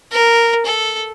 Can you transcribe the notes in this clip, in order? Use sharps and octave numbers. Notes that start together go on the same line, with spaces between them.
A#4
A4